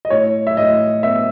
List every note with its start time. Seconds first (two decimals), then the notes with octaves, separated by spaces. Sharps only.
0.05 D#5
0.10 A2 C#5
0.47 E5
0.57 A2 D#5
1.03 B3 E5